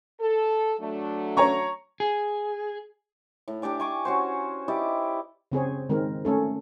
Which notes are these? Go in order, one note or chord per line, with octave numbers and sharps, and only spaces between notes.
A4
F#3 A3 D4
C#5 A#5 C#6
G#4
A2
D4 G4 D5 G#5
G#5 C#6 D6
C#4 F#4 C5
E4 G4 D5 D#5
C#3 C4 G#4 C#5
D#3 G#3 C4 A#4
A3 C#4 A4